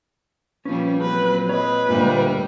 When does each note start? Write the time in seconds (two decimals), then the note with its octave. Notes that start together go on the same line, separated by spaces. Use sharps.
0.65 A#2 F3 G3 C#4 B4
1.01 A#2 F#3 C4 B4
1.49 B4 C#5 D#5
1.89 D2 G2 A#2 G3